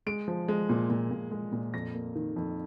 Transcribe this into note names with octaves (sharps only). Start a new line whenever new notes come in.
G#3 D7
F3
G#3
A#2
A#2
A#2
G#3
A#2
F2 A#6
A#3
D#3
F2